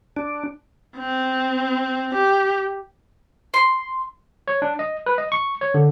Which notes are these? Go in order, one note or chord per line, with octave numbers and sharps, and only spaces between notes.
D4
C4
G4
C6
C#5
D4
D#5
B4
D#5
C#6
C#5
D3